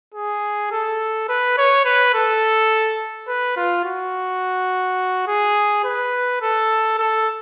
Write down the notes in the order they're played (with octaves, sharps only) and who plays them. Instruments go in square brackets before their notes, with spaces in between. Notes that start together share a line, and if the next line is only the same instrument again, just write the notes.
[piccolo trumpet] G#4
A4
B4
C#5
B4
A4
B4
F4
F#4
G#4
B4
A4
A4